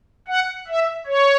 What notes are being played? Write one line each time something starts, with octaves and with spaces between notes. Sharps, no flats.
F#5
E5
C#5